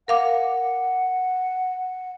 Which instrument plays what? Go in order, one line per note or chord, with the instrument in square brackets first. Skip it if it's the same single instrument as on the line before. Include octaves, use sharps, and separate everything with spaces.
[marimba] A#4 F5 D6 [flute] F#5